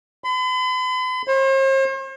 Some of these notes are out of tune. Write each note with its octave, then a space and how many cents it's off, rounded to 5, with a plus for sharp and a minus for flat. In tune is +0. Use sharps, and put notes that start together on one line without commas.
B5 +45
C5 +45